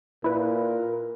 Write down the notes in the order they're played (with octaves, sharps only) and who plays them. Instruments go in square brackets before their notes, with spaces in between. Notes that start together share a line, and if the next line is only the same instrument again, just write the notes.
[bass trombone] A#2 [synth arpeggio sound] E4 B4 [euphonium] A#4